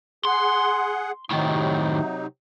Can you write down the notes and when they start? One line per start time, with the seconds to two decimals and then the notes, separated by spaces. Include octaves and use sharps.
0.25 G#4 F#5 C6
1.31 A2 C3 D#3 F#3 D#4